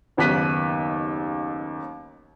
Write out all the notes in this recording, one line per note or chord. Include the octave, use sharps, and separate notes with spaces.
F#1 D#2 B3 F#6 B6 D#7